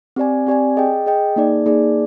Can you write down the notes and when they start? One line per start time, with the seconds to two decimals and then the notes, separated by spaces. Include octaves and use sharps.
0.16 C4 G4 D5 G#5
0.47 C4 G4 D5 G#5
0.77 G#4 D#5 G5
1.06 G#4 D#5 G5
1.36 A#3 D#4 G#4 D5
1.66 A#3 D#4 G#4 D5